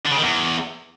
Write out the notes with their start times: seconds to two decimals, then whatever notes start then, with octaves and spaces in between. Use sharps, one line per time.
0.06 D3
0.11 C#3
0.17 D#3
0.22 E2